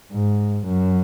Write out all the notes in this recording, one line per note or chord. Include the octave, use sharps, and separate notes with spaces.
G#2
F#2